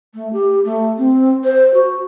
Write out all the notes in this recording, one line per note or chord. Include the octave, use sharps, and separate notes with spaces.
A3
G4
A3
C4
C5
F#4